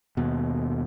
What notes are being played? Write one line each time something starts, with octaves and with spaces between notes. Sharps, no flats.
D#2 B2